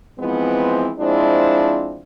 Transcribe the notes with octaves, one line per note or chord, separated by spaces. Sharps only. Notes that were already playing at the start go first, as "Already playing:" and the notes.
E3 F3 G#3 B3 C4
F3 G#3 C4 D4 E4